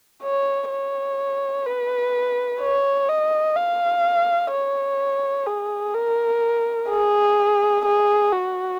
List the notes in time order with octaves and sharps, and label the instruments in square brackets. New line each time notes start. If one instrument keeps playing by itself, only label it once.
[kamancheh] C#5
C#5
B4
C#5
D#5
F5
C#5
G#4
A#4
G#4
G#4
F#4